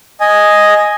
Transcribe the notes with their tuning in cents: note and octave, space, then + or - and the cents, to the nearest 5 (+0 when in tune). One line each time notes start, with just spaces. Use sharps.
D#5 +0 G#5 +0